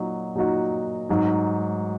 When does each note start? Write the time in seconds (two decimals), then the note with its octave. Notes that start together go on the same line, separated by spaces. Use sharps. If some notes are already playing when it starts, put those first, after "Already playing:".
Already playing: A#2 F#3 D#4 F#4
0.35 A#2 F#3 D#4 F#4
1.09 G#2 F#3 D#4